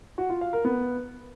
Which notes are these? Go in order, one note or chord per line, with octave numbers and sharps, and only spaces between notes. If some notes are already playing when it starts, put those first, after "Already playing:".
F#4
F4
F5
A#4
B3